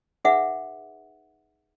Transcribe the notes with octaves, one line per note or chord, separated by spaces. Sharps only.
D#4 G#4 B4 E5 F#5